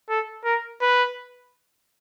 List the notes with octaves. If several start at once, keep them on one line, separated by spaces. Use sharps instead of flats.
A4
A#4
B4